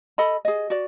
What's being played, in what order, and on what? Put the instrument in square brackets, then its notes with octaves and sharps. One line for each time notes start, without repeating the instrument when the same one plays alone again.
[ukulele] A4 D#5 B5
G#4 D#5
F#4 D5